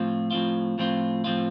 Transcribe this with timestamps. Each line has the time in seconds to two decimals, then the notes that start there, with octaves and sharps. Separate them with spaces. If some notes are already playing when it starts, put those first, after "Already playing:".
Already playing: A2 F3 C4 F4
0.31 A2 F3 C4 F4
0.78 A2 F3 C4 F4
1.24 A2 F3 C4 F4